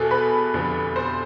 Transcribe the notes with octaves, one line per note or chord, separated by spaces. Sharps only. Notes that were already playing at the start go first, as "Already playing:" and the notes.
Already playing: E2 B2 G#4 A4
B4
F1 E2 D3 F3
C5